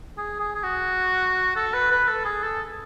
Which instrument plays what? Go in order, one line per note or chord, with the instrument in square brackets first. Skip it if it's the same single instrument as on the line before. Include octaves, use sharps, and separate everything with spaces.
[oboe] G#4
G#4
G#4
F#4
A4
B4
B4
A4
G#4
A4